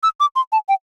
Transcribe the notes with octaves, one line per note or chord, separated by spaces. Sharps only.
E6
D6
C6
A5
G5